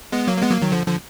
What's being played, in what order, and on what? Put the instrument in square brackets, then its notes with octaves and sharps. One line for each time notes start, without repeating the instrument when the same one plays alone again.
[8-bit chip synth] G#3 B3
F#3 A#3
A#3
G#3 B3
F#3 A#3
D#3 F#3
D3 F3
D3 F3